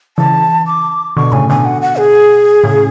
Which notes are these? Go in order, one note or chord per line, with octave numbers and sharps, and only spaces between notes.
C#3 E3 A5
D6
B2 D3 C#6
A2 C#3 G#5
B2 D3 G#5
F#5
F#5
G#4
A2 C#3